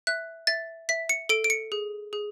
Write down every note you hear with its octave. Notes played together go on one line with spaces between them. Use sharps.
E5 F#6
E5 A6
E5 B6
C#7
A4 D7
D7
C#7
G#4
G#4